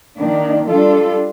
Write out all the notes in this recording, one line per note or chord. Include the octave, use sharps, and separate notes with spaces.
D#3 A#3 D4
G3 D4 F4 A4